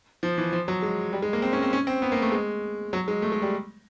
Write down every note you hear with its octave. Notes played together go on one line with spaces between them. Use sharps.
F3
E3
F3
F#3
G#3
G3
G#3
A#3
C4
C#4
C4
C#4
C4
B3
A#3
A3
G#3
F#3
G#3
A3
G#3
G3